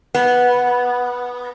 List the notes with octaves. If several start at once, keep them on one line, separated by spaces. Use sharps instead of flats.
B3